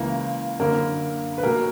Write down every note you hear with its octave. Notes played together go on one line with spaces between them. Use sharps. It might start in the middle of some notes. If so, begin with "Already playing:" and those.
Already playing: C#2 C#3 E3 A#3
F#1 F#2 D3 F#3 A#3 A#4
B4
B1 B2 F#3 A#3 A#4